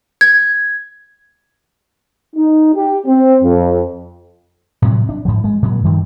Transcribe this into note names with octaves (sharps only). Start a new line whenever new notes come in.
G#6
D#4
G4
C4
F2
A2 C3 F#3 G3
D4
G#2 F3
G#3
A#2 F#3 G3
G2 D#3 F3 G3